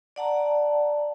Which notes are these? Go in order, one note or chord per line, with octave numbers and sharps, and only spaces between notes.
D5 F#5 A5 A#5